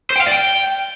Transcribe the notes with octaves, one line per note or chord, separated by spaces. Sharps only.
C5
G5
F5
D5
G5